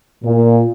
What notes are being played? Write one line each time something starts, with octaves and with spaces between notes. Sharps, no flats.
A#2